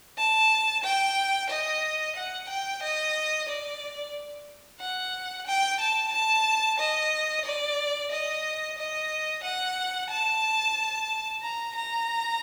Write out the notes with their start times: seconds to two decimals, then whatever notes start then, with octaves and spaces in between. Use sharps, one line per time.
0.18 A5
0.84 G5
1.50 D#5
2.16 F#5
2.49 G5
2.82 D#5
3.48 D5
4.81 F#5
5.47 G5
5.80 A5
6.13 A5
6.79 D#5
7.45 D5
8.11 D#5
8.78 D#5
9.43 F#5
10.10 A5
11.42 A#5
11.75 A#5